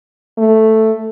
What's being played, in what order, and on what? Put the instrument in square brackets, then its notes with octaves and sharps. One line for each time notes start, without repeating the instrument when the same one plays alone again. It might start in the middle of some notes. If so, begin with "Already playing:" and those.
[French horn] A3